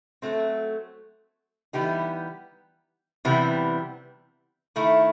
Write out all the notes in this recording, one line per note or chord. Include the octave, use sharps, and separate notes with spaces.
F#3 A3 C4
E3 G3 B3 D#4 G4
C3 E3 G3 B3
D#3 A3 E4